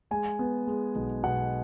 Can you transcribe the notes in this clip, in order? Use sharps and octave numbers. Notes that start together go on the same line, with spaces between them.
G#3 G#5
B3
G#3
B1
B2 F#5